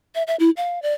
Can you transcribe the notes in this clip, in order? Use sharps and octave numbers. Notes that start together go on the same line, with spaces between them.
E5
E5
E4
F5
D5